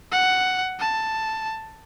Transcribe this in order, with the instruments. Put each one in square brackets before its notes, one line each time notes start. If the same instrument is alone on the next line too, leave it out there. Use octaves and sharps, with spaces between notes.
[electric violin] F#5
A5